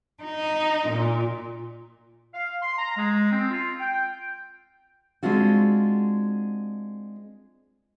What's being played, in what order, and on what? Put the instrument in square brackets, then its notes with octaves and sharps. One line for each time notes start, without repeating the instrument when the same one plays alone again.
[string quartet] D#4
A#2
[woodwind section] F5
C6
A#5
G#3
C4
F4
G5
[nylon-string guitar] G#3 C4 D4 F4 F#4